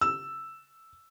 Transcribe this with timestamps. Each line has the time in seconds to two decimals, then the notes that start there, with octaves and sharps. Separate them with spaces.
0.01 E6